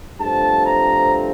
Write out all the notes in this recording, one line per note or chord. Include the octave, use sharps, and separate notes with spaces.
G2 F3 A3 C4 A5
A#5